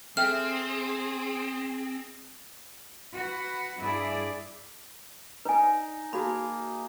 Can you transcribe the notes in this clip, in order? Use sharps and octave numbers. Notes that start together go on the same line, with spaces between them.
C4 G#4 A4 E5 G5 F6
F#4 B4
G2 E4 G#4 D5
D#4 B4 G#5
A#3 F#4 G#4 A5 B5